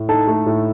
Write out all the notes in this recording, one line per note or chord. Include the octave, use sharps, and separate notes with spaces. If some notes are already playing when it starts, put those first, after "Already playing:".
Already playing: A2
D#4 A4 A5
A3
A2